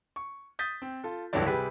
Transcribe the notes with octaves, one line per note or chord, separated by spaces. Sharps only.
C#6
D#6 G6 A6 B6
C4
F4 A4
C#2 G2 D3 E3 F#3 D5
C3 G3 G#4 B4 B6